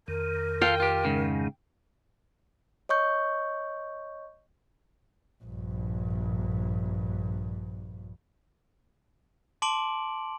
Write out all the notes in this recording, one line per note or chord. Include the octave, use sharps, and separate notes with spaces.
F2 D#3 A#4
F4 A4 F5 G5
F4 G4
G#2 C#3
C#5 D#5 C#6 G6
A#1 G2
A5 C6 D6 D7 F#7